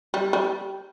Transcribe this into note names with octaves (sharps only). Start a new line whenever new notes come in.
G3
G3